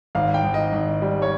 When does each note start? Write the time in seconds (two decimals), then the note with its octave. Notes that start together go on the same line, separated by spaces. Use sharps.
0.15 G#1 F5
0.34 G5
0.44 G#1
0.54 D#5
0.73 G#1
1.02 G3
1.22 C#5